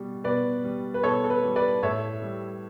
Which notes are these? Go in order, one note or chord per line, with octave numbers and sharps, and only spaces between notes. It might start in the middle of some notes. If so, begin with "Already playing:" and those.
Already playing: B2 G3
B2 B4 D5
G3
B4
B2 A4 C#5
A4
B4
G3
B4 D5
A2 C#5 E5
G3